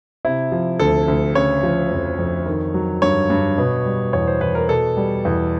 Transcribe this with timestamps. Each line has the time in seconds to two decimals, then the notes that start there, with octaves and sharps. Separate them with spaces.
0.25 C3 E4
0.52 F3
0.79 D2 A4
1.08 D2
1.35 C#3 C#5
1.63 F3
1.91 F2
2.19 F2
2.46 D#3
2.74 F#3
3.02 G2 C#5
3.30 G2
3.58 B2
3.85 G3
4.13 E2 C#5
4.27 C5
4.41 E2 B4
4.55 A#4
4.69 B2 A4
4.97 G3
5.25 E2